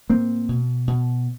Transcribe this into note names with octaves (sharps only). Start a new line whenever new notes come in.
A2 A#3 C4
B2
B2